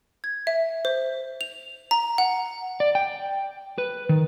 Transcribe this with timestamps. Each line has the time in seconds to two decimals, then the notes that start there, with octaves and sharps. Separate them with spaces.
0.24 G#6
0.47 E5
0.85 C5
1.41 F7
1.91 A#5
2.18 F#5
2.80 D5
2.95 G5
3.78 B4
4.09 D#3